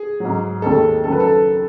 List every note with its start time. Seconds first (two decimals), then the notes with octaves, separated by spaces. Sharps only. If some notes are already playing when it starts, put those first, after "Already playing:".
Already playing: G#4
0.20 F#3
0.25 G#2
0.62 D#2 D#3 G#3 A4
1.04 F#2 D#3 F#3 A4
1.12 B4
1.20 A4